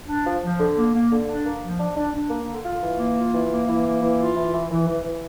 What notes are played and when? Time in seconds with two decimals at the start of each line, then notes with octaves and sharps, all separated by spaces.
0.08 D4
0.25 F3
0.42 F3
0.60 D3
0.77 A#3
0.94 A#3
1.12 D3
1.28 D4
1.45 A#3
1.62 F3
1.79 D4
1.96 D4
2.14 D4
2.30 A#3
2.48 D3
2.65 F4
2.82 E3
2.99 A#3
3.17 F4
3.33 E3
3.51 A#3
3.68 E3
3.85 A#3
4.02 E3
4.19 F4
4.36 E3
4.53 E3
4.71 E3
4.87 E3
5.05 E3